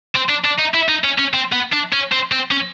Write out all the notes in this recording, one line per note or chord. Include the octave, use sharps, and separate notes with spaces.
C4
D4
D4
D#4
E4
D#4
C#4
C#4
C4
B3
D4
C#4
C4
C4
C#4